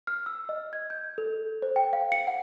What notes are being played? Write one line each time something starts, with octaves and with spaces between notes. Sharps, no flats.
F6
E6
D#5
G#6
G6
A4
C5
G5
F5
C#7
F#5